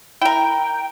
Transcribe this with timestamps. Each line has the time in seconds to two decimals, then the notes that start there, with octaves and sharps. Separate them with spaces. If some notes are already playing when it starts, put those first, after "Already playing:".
0.22 E4 A#4 G5